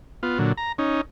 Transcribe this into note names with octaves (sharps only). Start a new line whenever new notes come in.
B3 F4
A#2 D3 F#3
A#5
C#4 D#4